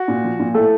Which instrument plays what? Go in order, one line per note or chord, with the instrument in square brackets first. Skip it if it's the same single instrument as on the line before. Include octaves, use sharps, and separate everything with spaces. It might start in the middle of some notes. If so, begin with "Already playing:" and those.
Already playing: [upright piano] F#4
A#2
F3
A#2
A2 A3 A4